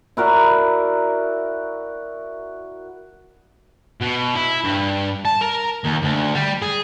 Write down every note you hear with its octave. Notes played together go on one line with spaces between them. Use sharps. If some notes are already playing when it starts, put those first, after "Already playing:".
E4 F#4 A#4 D5
B2
E4
G2
A5
A#4
D#2
D2
G3
G#4